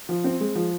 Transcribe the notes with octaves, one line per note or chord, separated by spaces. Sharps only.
F3
C4
G#3
F3